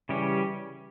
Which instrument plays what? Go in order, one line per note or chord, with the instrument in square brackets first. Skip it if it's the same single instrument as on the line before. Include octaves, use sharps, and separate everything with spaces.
[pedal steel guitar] C#3 E3 G3 C#4 G4